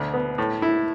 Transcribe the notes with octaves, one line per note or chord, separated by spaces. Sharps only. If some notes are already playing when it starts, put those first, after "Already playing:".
Already playing: D2 B2
B3
A2
E4